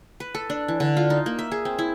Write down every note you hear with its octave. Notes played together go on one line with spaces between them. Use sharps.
B4
A4
D4
E3
D3
F4
D#4
A#3
E5
G#4
C4
E4